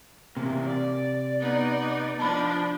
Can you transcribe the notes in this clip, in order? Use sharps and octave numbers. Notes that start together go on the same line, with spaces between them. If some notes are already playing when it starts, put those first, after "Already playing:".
C3 E3 A#3
D5
B3 D#4
F3 D4 A5 B5